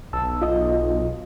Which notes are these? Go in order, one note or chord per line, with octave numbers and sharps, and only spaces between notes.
B1 A5 E6
F4 D#5